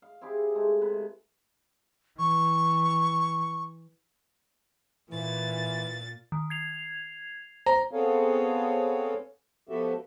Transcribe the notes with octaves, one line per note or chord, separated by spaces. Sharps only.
F5
C4 E4 G4 G#4
G#3 A3
C3 B4
E3 C#6
A#2 E3 A6
D#3
G#6 C7 F7
C5 A#5
B3 C4 G#4 A4 C#5 F5
F3 B3 F#4 G4 A4 E5